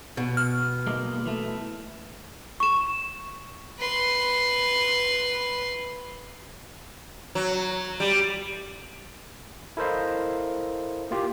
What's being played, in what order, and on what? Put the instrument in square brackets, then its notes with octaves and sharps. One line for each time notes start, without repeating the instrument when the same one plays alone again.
[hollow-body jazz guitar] B2
[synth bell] F6
[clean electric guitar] G#3 A#3 D#4
E3 A3
[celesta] C#6 E7
[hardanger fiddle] B4 C6
[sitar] F#3
G3
[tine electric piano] E4 A4 A#4 C5 D#5 F5
A#3 F4 G4